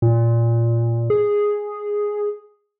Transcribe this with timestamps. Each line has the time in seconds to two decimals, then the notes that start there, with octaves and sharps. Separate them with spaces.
0.02 A#2
1.10 G#4